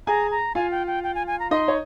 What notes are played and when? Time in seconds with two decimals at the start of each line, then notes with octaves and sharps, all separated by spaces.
0.07 G#4 G#5 A#5
0.31 A#5
0.55 F4 F5 G#5
0.71 G5
0.87 G5
1.03 G5
1.15 G#5
1.27 G#5
1.40 A#5
1.51 D#4 D#5 C6
1.68 C#5